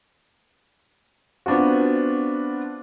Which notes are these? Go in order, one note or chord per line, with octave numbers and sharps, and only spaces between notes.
B3 C4 D4 F4 F#4